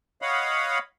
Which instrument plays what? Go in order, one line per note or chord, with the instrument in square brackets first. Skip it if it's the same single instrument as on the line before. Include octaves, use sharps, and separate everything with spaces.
[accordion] C#5 D#5 F5 F#5 B5